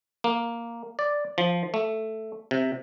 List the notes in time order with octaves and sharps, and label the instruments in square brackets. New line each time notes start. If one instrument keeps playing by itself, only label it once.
[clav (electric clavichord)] A#3
D5
F3
A3
C3